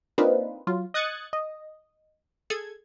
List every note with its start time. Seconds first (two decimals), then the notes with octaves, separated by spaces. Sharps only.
0.18 A#3 C4 D4 D#4 F4 B4
0.67 F#3 F4
0.94 D#5 D#6 F#6 G#6 A6 C#7
1.33 D#5
2.50 G#4 A4 G#6